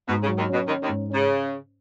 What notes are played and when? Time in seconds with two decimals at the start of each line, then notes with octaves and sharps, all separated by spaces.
0.09 G#2 B2
0.24 C#3
0.28 F#3
0.38 D#2 D#3
0.49 B2 C#4
0.68 D#2 D#3 C#4
0.83 D#2 D#3
0.89 G#2
1.10 C#3 C#4